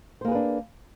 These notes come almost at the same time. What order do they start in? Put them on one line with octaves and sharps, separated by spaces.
C5 A#3 G#4 B4 D4